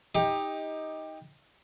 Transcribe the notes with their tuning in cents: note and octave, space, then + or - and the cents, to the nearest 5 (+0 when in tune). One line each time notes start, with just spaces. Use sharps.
D#4 +15 G4 +20